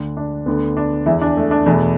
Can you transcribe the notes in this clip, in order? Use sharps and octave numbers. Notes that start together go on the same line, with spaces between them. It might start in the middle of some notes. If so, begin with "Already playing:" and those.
Already playing: D2 D3
D4
D2 D3 B3
D4
E2 E3 E4
D4
A3
D4
E2 B2 A3